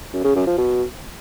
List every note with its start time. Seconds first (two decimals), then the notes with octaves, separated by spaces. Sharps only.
0.13 F#2
0.24 C#3
0.35 F#2
0.47 F3
0.58 B2